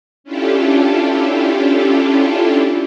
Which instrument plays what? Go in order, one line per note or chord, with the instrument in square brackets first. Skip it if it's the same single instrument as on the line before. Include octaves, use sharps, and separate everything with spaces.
[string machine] C#4 D4 E4 F4 G4 A4